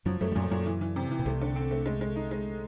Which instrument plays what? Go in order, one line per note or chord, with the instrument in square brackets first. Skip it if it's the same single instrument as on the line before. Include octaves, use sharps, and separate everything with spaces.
[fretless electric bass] F#2 F#3 [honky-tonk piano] F3
[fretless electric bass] F#2 F#3 [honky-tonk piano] A3
[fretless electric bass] G3
[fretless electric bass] F#2 F#3 [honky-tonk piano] A#2
[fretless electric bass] F#2 F#3 [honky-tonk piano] A#2
[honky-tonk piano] E3
E3
C3
E3
[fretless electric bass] B2
[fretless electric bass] C2 C3 [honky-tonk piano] A3
[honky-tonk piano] D3
C4
A3
G#3
G#3
D#4
G#3